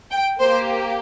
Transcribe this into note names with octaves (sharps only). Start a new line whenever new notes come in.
G5
A#3 G4 C5